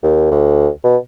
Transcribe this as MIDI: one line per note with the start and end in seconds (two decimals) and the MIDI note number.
0.03 0.28 39
0.31 0.69 38
0.84 0.97 47